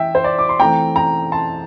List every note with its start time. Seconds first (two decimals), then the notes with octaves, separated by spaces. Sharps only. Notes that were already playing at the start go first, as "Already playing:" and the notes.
Already playing: E3 E5 G5
0.15 C5
0.24 D5
0.39 D6
0.49 C6
0.60 E3 A3 C4 G5 A#5
0.96 G5 A#5
1.32 A5 C6